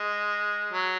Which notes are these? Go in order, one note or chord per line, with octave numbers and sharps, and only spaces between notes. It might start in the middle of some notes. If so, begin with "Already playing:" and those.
Already playing: G#3
F#3